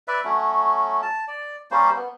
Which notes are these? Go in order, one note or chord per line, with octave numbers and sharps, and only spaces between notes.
B4 D5 E5
F#3 A3 C#4
A5
D5
G3 A#3 C#4 C5
B3